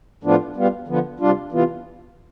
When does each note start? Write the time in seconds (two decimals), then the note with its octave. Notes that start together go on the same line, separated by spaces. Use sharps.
0.23 A2 F3 B3 D4 F4
0.56 B2 G3 B3 F4
0.87 D3 F3 B3
1.20 C3 G3 D4 F4
1.52 C3 E3 B3 F4